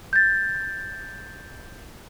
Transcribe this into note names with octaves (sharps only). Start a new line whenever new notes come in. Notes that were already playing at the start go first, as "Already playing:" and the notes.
G6 A6